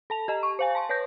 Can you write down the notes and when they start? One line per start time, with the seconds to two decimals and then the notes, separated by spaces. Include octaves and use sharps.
0.10 A4 A5 F7
0.28 G4 D#5 A#5
0.43 C#6
0.59 C5 F5 G#5
0.75 A5 C6 C#6
0.89 B4 C#5 A5 G6 A#6